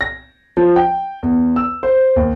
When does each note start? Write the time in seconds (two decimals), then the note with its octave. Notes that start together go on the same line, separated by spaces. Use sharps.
0.01 A#6
0.57 F3
0.76 G5
1.23 E2
1.56 E6
1.83 C5
2.16 D#2